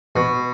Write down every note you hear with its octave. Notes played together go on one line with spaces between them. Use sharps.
B2